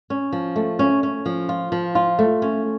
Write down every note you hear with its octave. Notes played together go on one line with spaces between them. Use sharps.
C#4
F3
A3
C#4
C#4
F3
F4
F3
F4
A3
C#4